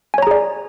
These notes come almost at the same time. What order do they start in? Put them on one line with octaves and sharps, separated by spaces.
G#5 C#5 A#5 G#4 D5